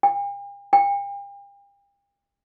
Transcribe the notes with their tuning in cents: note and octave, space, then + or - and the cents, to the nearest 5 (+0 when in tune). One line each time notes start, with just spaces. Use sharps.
G5 +45
G5 +40